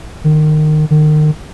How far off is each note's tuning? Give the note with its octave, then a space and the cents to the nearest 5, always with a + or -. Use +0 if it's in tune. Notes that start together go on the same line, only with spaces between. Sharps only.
D#3 -25
D#3 -35